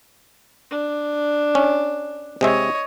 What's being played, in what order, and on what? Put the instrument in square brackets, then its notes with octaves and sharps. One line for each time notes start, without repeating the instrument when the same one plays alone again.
[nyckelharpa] D4
[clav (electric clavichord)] C#4
[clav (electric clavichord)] C3 G#3 E5 [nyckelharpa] C#5 D#5